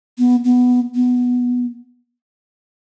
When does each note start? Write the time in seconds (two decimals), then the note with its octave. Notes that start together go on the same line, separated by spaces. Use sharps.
0.18 B3
0.44 B3
0.95 B3